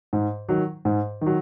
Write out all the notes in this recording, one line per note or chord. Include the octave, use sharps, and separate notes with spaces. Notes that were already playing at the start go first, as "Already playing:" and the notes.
G#2
D#3 F#3
G#2
D#3 F#3